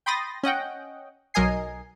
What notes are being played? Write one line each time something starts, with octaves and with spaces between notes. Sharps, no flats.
G5 B5 C6 D#6 A6 A#6
C#4 D#5 F#5 G5
B1 F#3 A#4 D#5 G#5 C7